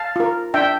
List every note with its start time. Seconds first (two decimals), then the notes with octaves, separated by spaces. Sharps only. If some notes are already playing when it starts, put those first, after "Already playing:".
Already playing: F5 A5
0.16 F4 A#4
0.54 D4 E5 G5